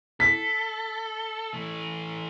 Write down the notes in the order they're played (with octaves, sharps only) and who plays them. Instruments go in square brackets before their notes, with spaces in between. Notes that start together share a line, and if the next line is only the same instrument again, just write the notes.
[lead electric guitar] A4 [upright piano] B6
[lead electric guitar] E3 A3